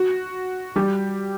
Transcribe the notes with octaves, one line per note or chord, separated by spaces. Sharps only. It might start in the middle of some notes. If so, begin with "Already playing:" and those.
Already playing: F#4
G3 G4